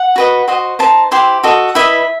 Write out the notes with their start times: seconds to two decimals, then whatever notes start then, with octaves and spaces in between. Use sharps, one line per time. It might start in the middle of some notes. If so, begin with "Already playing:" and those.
Already playing: F#5
0.16 F#4 B4 D#5
0.48 F#4 C5 D#5
0.79 D#4 A4 C5 A5
1.11 E4 G4 C5 C6
1.43 F#4 A4 D#5
1.75 E4 B4 D#5 E5